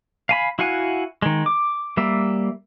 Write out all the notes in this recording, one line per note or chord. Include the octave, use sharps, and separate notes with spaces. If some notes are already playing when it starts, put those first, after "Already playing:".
F5 G#5 B5
E4 F#4 F5 F#5 G#5
D#3 G#3
D6
G3 A#3 E5